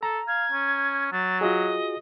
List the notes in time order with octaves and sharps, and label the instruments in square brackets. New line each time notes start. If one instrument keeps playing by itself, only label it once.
[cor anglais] A4 [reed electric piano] A#5
[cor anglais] F5 [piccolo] G#6
[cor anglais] C#4
[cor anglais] F#3 [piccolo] A6
[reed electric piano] F4 F#4 G#4 [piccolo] D#5